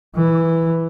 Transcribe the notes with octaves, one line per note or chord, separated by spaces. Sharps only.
E3